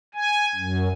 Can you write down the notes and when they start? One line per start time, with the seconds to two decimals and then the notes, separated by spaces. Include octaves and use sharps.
0.14 G#5
0.56 F#2